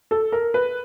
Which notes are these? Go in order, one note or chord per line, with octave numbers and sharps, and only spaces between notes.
A4
A#4
B4